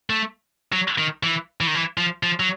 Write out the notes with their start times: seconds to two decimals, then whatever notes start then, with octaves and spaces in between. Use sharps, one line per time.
0.10 A3
0.73 F#3
0.98 D#3
1.23 E3
1.61 E3
1.67 D#3
1.75 E3
1.98 F3
2.23 F3
2.40 F#3